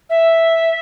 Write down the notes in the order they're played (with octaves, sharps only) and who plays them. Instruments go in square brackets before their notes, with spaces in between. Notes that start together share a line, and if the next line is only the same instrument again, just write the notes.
[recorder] E5